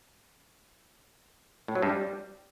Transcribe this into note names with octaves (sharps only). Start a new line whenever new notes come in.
A2
F#3
G2
G3